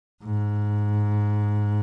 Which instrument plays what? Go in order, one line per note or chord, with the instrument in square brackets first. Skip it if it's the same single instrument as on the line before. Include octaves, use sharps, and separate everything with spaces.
[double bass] G#2